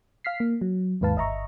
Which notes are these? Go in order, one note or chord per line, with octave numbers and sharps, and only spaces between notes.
F5 F6 B6 C7
A#3
F#3
D#2 G#2 B4 F5 A5
G1 D#5 E5 A#5 C#6